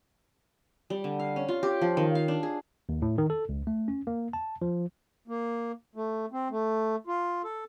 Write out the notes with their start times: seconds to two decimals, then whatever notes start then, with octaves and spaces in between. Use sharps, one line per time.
0.90 G3
1.04 D3
1.20 F5
1.36 C#4
1.49 F4
1.63 G4
1.81 F3
1.97 D#3
2.15 F5
2.28 D4
2.43 G#4
2.89 D#2
3.02 A2
3.18 D#3
3.30 A4
3.49 C#2
3.67 A3
3.88 C#4
4.07 A#3
4.33 A5
4.62 F3
5.28 A#3
5.96 A3
6.32 C4
6.50 A3
7.07 F4
7.44 A4